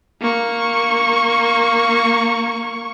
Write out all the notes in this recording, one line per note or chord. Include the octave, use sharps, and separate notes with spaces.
A#3 C#6